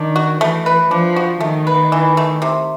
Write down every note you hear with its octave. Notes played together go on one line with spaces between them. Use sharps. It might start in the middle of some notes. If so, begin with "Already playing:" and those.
Already playing: D#3 D4
F#4
E3 A3
B4
F3 D4
F#4
D#3 A3
B4
E3
A3
C3